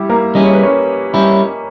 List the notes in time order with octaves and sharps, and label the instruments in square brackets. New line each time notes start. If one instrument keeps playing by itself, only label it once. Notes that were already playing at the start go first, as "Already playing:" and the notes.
Already playing: [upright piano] G3 E4 G4
A#3 A#4
[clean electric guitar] G3 C#4 E4 G#4 [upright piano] D#5
[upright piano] C#5
B4
C#4 C#5
[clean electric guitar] G3 C#4 E4